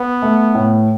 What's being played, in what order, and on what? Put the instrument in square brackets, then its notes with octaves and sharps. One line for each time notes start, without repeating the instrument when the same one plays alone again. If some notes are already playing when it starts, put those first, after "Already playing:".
Already playing: [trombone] B3
[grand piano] A3
A2